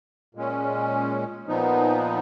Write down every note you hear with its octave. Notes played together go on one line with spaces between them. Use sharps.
A#2 G#3 C#4
A#2 F3 B3 D#4